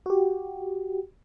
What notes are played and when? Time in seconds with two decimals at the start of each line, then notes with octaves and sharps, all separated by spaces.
0.06 F#4 G4